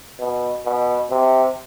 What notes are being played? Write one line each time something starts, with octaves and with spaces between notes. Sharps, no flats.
B2
B2
C3